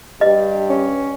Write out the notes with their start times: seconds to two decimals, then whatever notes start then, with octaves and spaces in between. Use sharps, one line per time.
0.21 G2 G4 D#5
0.70 C#4